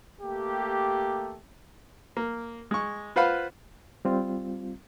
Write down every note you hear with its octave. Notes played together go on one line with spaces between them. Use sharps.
A3 A#3 G4
A#3
G#3 C#6
F4 B4 C5 F5 F#5 B5
G3 C4 F4